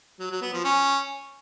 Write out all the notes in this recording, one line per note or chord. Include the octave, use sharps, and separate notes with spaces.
F#3
F#3
B3
F3
C#4